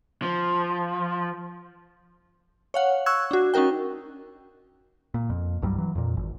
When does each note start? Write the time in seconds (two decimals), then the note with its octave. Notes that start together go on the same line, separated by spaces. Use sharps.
0.22 F3
2.74 C#5 F5 F#5
3.06 C#6 E6 F#6 G#6
3.31 D4 F#4
3.54 C#4 D#4 F#4 A#4 G5
5.14 A#2
5.30 F2
5.62 C2 G2 F#3 G3
5.78 E3 F#3
5.95 F2 A#2
6.17 G#1